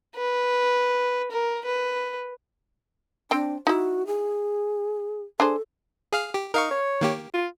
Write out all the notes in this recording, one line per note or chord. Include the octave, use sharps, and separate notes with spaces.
B4
A#4
B4
C4 D4 G5
D#4 E4 F#4
G#4
D4 G#4 A4 C5
G#4 F5 F6
G4
D#4 A#4 F5 C#6
C#5
D#3 A#3 G4
F4